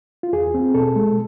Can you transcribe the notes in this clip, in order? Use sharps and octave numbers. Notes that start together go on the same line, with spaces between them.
F4
E2 G#4
C4
B2 A4
G#3